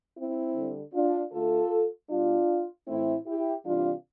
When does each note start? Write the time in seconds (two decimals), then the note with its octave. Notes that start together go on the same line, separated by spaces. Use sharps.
0.16 C4 E4
0.55 D3 G3
0.94 D4 F4
1.32 D3 A3 F4 A4
2.10 B2 G3 D4 F4
2.87 A2 E3 A3 C4 E4
3.26 E4 G4
3.65 C3 E3 G3 D4 F4